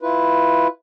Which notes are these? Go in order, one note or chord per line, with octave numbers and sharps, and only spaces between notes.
E4 F4 B4